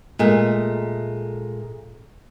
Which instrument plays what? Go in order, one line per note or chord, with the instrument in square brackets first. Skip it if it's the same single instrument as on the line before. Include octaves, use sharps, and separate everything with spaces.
[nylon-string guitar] A#2 G#3 A3